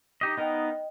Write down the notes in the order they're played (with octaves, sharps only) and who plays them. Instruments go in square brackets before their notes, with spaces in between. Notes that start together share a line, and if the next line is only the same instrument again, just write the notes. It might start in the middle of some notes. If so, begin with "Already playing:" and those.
[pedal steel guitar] D#4 G4 D#5
[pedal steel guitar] B3 D#4 A#4 [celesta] D#5 G5